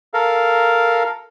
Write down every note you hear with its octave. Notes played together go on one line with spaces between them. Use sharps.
A4 A#4 F5